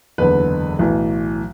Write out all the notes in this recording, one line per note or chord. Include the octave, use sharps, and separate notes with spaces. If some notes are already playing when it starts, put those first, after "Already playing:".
F#1 E2 D3 B4
B1 A2 E3